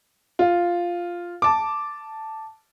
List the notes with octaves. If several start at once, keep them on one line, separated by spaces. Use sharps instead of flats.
F4
A5 D6